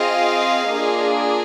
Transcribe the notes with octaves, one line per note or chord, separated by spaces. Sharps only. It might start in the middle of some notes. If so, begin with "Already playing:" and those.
Already playing: C4 F4 G#4 D#5 F5
A#3 D4 F4 G#4